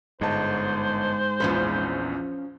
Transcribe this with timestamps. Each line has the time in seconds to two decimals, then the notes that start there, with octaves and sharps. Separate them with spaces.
0.21 G1 G#2 C5 D#5 A5
1.40 A#1 E2 F3 C#4 B4